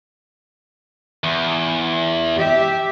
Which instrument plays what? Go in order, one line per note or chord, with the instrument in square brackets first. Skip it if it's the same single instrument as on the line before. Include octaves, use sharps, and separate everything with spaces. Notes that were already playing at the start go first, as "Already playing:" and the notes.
[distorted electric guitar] E2
[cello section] G4 E5